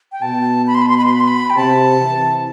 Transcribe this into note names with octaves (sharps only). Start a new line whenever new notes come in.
G5
B2 A5
B5
C6
B5
C6
B5
C6
B5
C6
B5
G5
C3 A5
C3 E3